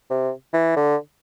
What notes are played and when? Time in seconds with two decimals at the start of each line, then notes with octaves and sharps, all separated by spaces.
0.10 C3
0.54 E3
0.76 D3